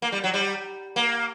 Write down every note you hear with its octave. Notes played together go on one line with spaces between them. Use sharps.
A#3
G3
F#3
G3
A#3